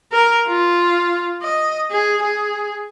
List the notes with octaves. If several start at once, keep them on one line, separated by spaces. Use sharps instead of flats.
A#4
F4
D#5
G#4
G#4